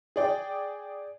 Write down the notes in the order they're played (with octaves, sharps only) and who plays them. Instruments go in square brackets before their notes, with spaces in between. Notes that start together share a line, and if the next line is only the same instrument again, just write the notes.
[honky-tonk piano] G#4 D5 G5